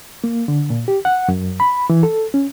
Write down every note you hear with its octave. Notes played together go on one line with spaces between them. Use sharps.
A#3
D3
A#2
G4
F#5
F#2
B5
E3
A4
C#4